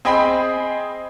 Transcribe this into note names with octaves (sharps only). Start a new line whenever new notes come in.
C4 G#4 D#5 G5 B5